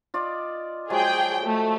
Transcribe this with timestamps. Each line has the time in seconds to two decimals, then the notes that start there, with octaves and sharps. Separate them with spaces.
0.14 F4 D5 D#5
0.90 F3 F#3 G#3 G#4 G5
1.45 A3